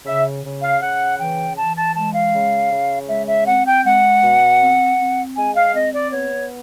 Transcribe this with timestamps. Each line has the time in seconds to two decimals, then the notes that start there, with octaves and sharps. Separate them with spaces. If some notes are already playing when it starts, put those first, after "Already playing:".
0.06 C#3 E5
0.44 C#3
0.62 F5
0.82 C#3 F#5
1.19 E3 G5
1.57 E3 A5
1.77 A5
1.95 G#3 A5
2.14 F5
2.33 C#3
2.71 C#3
3.08 G#3 E5
3.28 E5
3.46 C4 F#5
3.66 G5
3.85 G#3 F#5
4.23 B2
4.61 C4
4.99 C4
5.36 G#3 G#5
5.55 F5
5.74 C4 D#5
5.93 D5
6.12 B3 C#5